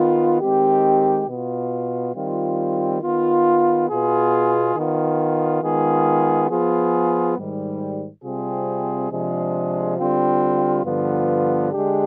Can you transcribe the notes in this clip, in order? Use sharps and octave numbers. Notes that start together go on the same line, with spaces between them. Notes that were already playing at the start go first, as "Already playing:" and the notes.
Already playing: D#3 B3 F4
D#3 G#3 C4 G4
B2 B3 F4
D#3 G3 C4 F4
D#3 B3 F4
B2 B3 F4 G#4
D#3 B3 F4
D#3 G#3 B3 F4 G#4
F3 B3 F4 G#4
G#2 D#3 G3
C3 G3 C4 F4 G#4
C3 F3 G#3 D4 G#4
D3 G3 C4 F4
G2 D3 F3 B3 F4
D3 G#3 D4 G4